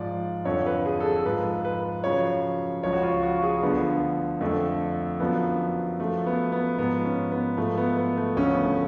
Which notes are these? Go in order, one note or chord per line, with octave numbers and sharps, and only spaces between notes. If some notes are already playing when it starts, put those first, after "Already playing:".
Already playing: G#2 F3 D5
F2 D3 F3 C#5
B4
G#4
A4
G#4
G#2 F3 B4
B4
F#2 C#3 F3 C#5
C#2 C#3 F3 C#5
F#4
F4
F#4
G#4
D2 D3 F3 B3
F2 D3 F3 A3
F#2 D3 F3 B3
F#2 F3 A3
B3
B3
G#2 F3 B3
C#4
B3
G#2 F3 A3
B3
B3
A3
D2 C#3 F3 C#4
B3
A3